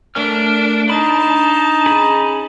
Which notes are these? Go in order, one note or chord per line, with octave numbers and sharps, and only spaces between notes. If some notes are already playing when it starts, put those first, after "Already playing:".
A3 D4 A#4 F6
D4 D#4 A5 B5
C#4 G#4 B5